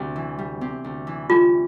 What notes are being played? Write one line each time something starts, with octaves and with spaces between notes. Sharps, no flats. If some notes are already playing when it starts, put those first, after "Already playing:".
Already playing: D2 C3 G3
E3
G3
C3
D2
E3
G3 F4